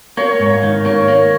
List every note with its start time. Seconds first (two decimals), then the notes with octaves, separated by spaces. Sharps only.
0.17 A#3 C#5
0.40 G#2
0.63 D#3
0.85 A#3 C#5
1.08 A#3